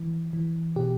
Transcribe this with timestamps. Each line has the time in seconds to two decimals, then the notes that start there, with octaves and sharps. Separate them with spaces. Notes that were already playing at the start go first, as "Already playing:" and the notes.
Already playing: E3
0.33 E3
0.76 B2 G4